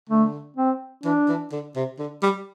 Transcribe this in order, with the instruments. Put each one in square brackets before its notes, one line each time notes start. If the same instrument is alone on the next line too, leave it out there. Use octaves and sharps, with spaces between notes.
[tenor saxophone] D3 [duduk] A3
[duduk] C4
[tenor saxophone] E3 [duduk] D4
[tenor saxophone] E3
D3
C3
D3
G3